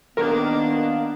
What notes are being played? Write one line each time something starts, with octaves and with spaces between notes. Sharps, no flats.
D#3 A#3 B3 D4 A#4